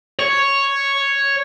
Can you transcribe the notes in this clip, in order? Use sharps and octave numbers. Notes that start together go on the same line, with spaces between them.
C#5